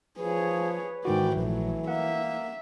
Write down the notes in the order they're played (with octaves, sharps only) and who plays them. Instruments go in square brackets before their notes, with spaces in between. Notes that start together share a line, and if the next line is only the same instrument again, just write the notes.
[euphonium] F3 [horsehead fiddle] G#4 C#5 [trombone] B4
[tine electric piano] G#2 D#3 F#4 [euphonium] E3 [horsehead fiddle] D5 G5
[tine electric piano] A#1 [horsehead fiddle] F#3 A3
[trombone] A#3 [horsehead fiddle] E5 [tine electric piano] F#5